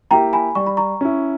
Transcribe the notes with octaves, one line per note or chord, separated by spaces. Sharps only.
A#3 E4 G4 G5 A#5
G#5 B5
G3 C#6
B5
A#5 C#6
C#4 E4